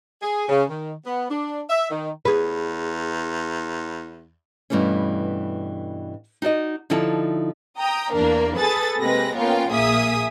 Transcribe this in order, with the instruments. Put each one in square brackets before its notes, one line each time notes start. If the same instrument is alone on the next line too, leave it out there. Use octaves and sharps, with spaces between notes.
[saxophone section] G#4
C#3
D#3
B3
D4
E5
D#3
[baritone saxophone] E2 [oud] G#4 B4
[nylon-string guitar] G2 B2 E3 A3 C#4
D#4 F#4 D5 D#5
D3 F3 D#4 E4 A4 A5
[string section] G5 A#5 D#6
E2 A#3 D4 A#4
G#4 A4 B4 D#6 A6
C3 G#3 A#3 B4 G5 A#6
A#3 B3 C#4 F4 A#4 G5
A#1 A#3 G#4 E5 D#6 B6